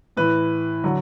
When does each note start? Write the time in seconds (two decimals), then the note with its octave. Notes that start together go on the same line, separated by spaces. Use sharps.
0.17 A2 E3 B4
0.84 D3 F#3